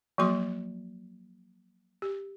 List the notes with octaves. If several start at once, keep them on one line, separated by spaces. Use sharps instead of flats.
F3 F#3 A#3 F#4 C6
G4